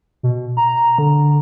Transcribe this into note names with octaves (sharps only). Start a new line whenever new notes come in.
B2
A#5
D3